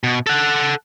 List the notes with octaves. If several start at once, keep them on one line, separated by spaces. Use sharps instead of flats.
B2
A4 F#5